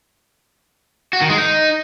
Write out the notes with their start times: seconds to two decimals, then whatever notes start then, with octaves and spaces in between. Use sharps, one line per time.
1.13 F#4
1.21 D#3
1.30 G#3
1.38 D#4